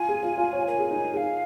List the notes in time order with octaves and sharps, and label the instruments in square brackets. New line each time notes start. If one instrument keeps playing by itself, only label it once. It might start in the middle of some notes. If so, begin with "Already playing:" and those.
Already playing: [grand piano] F4 [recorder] G#5
[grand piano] G#4
F4
F4
C#5
[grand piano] A#4 [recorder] G#5
[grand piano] G#4
D#4
[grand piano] G#4 [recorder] F5 G#5